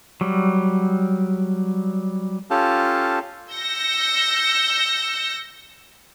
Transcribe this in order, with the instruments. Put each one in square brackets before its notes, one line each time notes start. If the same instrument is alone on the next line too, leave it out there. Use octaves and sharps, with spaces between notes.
[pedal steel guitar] F#3 G3
[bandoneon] C#4 F4 G4 A4 F5 A5
[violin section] E6 G6 A#6 C#7